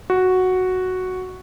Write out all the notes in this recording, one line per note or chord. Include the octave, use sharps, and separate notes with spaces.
F#4